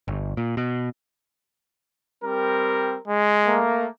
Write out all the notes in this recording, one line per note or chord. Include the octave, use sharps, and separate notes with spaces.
G1
A#2
B2
G3 C4 A#4
G#3
A3 A#3